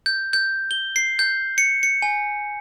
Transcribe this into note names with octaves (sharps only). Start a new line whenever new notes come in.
G6
G6
G7
C7
G6
C#7
C#7
G#5